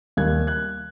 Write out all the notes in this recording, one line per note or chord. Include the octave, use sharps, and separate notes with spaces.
D#2 D#3 G3 F#6 G#6
F#6 G#6